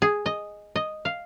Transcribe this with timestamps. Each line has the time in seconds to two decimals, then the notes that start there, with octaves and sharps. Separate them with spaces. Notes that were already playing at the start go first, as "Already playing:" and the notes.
0.02 G#4
0.26 D#5
0.76 D#5
1.05 F5